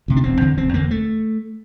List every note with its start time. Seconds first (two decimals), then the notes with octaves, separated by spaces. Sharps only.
0.08 D2 C3
0.16 D4
0.24 E1 C4
0.41 E2 D3
0.58 E1 C4
0.74 E2 D3 A#3
0.91 A3